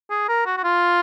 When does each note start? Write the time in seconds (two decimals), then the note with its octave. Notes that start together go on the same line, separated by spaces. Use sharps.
0.11 G#4
0.29 A#4
0.46 F#4
0.57 F#4
0.64 F4